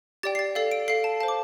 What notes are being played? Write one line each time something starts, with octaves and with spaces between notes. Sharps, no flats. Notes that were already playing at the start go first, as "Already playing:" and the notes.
G4 D5 G5 A6
C7
A6
A4 D5 F5 C7
D7
A4 F5 C7
A5
C5 F5 A5
D6